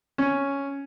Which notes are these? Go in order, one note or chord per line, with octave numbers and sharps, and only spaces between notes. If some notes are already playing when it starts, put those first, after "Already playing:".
C#4